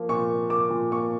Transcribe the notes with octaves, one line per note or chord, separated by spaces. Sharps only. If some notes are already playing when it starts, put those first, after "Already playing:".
Already playing: F3 A#3
A#2 C#6
A#3
A#3 D6
A#2
A#3 C#6